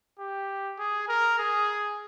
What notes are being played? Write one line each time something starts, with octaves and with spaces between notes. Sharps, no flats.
G4
G#4
A#4
G#4